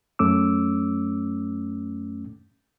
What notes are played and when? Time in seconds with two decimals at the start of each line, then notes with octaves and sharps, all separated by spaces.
0.19 F#2 A3 C#4 D6 E6